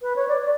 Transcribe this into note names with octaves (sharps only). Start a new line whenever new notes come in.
B4
C#5
D5
D5